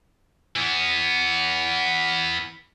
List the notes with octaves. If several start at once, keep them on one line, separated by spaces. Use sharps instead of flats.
E3 B3